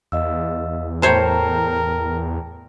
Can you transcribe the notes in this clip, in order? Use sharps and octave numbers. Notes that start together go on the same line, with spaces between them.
E2 D#5 F5 E6
A2 A#4 C5 C#5 G5 A5 A#5